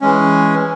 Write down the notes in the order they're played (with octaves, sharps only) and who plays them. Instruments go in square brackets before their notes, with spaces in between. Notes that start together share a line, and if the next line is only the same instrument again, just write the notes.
[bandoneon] E3 G#3 C#4